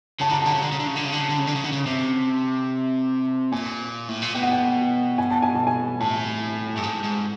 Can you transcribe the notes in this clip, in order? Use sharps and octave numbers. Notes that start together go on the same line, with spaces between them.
C#3 A5
D3 A#5
C#3
D3 A5
C#3
D3
C#3
D3
C#3
D3
C#3
D3
C#3
D3
C#3
D3
C#3
D3
C#3
C3
A#2 G#5
A2
A#2
B2 G5
F#5
G5
G#5
A5
G#5
A5
G#5
A2 A5
G2
G#2
G#2